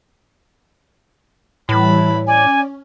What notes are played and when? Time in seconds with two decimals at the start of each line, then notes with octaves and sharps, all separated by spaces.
1.69 A2 E3 G3 E4 B4 A5 B5
2.27 C#4 D5 G#5